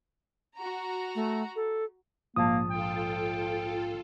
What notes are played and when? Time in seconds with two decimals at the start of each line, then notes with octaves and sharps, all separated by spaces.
0.55 F#4 A#5
1.15 A3
1.56 A4
2.36 A#1 G#2 A#3 A5 D#6
2.71 F4 A4 G5